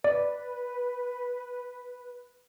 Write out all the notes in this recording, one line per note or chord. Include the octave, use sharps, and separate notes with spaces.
B4 D5